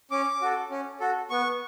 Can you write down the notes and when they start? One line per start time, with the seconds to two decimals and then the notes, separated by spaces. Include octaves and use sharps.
0.11 C#4 D6
0.42 F#4 A4
0.70 C#4
1.00 F#4 A4
1.30 B3 C#6